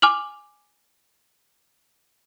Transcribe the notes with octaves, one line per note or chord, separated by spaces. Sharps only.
G#5 D6 F6 F7 F#7